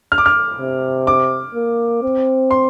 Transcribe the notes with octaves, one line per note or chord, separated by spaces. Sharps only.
F6
D6
F6
C3
D6
A#3
C4
C6